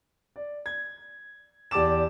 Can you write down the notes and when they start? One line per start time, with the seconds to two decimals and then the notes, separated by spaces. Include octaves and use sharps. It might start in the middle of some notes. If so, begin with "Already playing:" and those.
0.36 D5
0.66 G#6
1.71 E2 G4 D5 A5 D6 E7